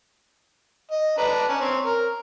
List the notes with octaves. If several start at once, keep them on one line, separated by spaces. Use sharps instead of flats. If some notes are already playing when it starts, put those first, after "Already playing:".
D#5
D4 B4 A#5
C#4
C4 C#5
A#4